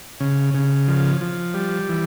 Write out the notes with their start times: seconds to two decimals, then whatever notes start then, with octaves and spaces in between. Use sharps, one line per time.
0.20 C#3
0.54 C#3
0.88 F3
1.21 F3
1.54 G3
1.89 E3